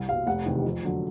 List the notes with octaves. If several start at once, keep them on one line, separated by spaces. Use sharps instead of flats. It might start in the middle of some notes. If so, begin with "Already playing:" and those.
Already playing: C2
B2 G3 F5
F1 F#5
E2 C3 D#3
F2
D3 F#3